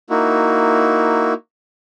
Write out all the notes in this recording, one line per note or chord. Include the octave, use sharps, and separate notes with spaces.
A#3 D#4 E4 F#4